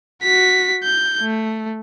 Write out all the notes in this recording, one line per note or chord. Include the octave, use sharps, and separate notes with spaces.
F#4 B6
G6
A3